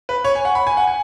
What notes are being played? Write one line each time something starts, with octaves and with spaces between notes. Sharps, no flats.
B4
C#5
G#5
F#5
B5
G#5
F#5
G#5